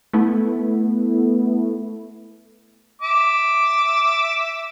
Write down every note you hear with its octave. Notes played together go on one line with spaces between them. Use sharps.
A3 B3 E4
E5 D6